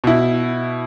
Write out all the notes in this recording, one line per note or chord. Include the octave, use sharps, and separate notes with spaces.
B2 E4